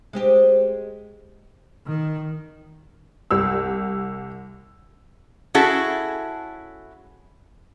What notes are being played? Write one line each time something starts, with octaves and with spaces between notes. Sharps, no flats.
G#3 C4 G4
D#3
C2 G4 E6
C#4 E4 F#4 G#4 A4 A5